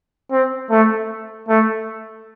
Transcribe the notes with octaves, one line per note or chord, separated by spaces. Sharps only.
C4
A3
A3